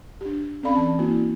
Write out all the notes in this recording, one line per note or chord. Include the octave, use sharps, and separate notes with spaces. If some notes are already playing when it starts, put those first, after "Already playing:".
D4 G4
C4 C#4 A4 D5 F5 B5
E3 D5 A5
A#3 E4 F#4